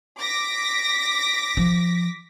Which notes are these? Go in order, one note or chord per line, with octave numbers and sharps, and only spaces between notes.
D6 A#6 B6
F3